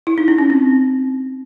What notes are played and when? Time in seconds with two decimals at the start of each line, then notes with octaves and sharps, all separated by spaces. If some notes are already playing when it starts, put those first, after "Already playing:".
0.07 E4
0.18 D#4
0.28 D4
0.38 C#4
0.50 C4